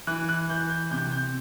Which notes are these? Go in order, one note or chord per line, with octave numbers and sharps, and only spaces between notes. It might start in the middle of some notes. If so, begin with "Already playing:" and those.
E3 F#6
F#6
E3 G6
G6
C3 G6
G6